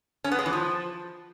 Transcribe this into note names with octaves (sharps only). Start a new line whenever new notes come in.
C#4
B3
G#3
E3
F3